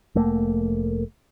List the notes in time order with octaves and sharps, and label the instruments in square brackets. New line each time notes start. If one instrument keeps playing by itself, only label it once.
[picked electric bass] F1 A3 A#3